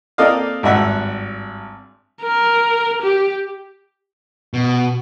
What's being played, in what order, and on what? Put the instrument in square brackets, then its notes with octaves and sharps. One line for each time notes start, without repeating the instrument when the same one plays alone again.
[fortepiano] A#3 C4 A4 D5 D#5 F5
G#1 G2 E5 F#5
[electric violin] A#4
G4
[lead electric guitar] B2